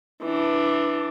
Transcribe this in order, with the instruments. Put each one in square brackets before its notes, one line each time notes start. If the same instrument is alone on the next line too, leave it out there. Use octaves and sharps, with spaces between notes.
[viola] E3 D4